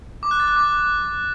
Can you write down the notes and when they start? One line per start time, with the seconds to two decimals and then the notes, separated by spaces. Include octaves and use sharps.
0.23 D6
0.31 F#6
0.40 A6
0.48 F#6
0.56 D6